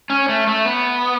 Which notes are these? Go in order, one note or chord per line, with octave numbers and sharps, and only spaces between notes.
C#4
A3
A3
B3